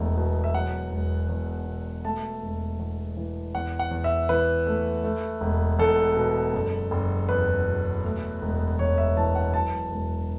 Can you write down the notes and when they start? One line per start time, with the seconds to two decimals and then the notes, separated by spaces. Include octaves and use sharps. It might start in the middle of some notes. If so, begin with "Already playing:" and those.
Already playing: E1 E2 A3
0.17 B2
0.44 E5
0.54 F#3 F#5
0.92 E1
1.29 E2
1.66 B2
2.04 A3 A5
2.42 E1
2.79 E2
3.17 E3
3.55 E2 F#5
3.79 F#5
3.91 E2
4.04 E5
4.29 E3 B4
4.67 A3
5.04 A3
5.41 E1
5.79 E2 A4
6.16 B2
6.53 F#1
6.91 F#1
7.29 E2 B4
7.67 B2
8.05 A3
8.42 E1
8.79 E2 C#5
8.98 E5
9.17 E3 A5
9.35 F#5
9.53 F#3 A5
9.91 E1